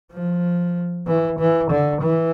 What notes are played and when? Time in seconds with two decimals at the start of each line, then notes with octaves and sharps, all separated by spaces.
0.12 F3
1.07 E3
1.39 E3
1.71 D3
2.02 E3